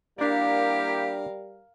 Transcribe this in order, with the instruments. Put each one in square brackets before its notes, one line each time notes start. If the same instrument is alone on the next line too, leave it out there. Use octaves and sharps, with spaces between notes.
[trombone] G3 [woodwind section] A#3 E4 G4 [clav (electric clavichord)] D4 D5 [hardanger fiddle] A#4 F5